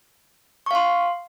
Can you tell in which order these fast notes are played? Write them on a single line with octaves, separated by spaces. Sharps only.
C#6 F5 C6